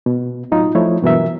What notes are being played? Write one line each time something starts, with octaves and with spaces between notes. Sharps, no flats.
B2
A2 F#3 D#4 F4
F3 A3 E4 C#5
G2 B2 E3 F#3 A#4 E5